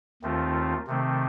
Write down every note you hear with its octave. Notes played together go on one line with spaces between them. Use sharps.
D#2 D#3 A3 C4 F4
C3 D#3 A3 C4